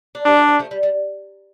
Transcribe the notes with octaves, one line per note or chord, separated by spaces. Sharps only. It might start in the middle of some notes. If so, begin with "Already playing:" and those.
D4
G3 C4 D4
F3 A3
F3 A3
F3 A3
G3
G3